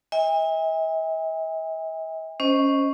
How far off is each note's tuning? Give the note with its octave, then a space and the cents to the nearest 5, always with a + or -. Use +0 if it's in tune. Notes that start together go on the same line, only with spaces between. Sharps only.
E5 -45 G#5 -45
C#4 +0 C5 +0 D#5 +0